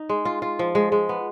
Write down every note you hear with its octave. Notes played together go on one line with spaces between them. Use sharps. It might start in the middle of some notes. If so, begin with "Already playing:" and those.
Already playing: D#4
G#3
F4
F4
F3
G#3
G#3
B3